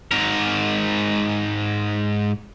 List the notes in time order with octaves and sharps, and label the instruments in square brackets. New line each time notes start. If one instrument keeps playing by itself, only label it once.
[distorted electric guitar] G#2 A#4